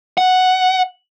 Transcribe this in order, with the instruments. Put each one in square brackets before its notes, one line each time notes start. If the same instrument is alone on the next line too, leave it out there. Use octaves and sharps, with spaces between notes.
[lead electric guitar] F#5